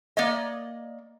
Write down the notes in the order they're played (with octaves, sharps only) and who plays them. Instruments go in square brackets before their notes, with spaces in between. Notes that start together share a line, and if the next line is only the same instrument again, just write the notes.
[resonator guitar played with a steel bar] A#3 D5 D#5